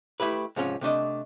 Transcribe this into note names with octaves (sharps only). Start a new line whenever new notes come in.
A3 E4 G4 B4
G#2 C3 F3 C#4
C3 A3 D4 D#5